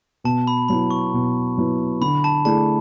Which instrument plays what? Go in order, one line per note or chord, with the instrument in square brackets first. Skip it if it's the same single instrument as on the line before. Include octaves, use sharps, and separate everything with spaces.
[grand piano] B2 [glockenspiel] A5
[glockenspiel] B5
[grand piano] F#3 B3 E4 [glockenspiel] B5
[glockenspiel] C#6
[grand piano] B2
F#3 B3 E4
[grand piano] D3 [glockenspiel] B5
[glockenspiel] A5
[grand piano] A3 E4 G#4 D5 [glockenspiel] A5